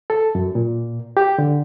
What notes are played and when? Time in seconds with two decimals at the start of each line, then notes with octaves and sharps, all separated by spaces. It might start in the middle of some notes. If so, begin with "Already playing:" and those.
0.10 A4
0.35 F#2
0.55 A#2
1.17 G4
1.38 D3